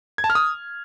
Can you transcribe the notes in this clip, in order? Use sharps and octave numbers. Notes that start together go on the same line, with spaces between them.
G#6
A5
F6
D#6